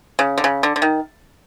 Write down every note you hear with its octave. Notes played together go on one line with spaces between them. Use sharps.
C#3
D3
C#3
D3
D3
D#3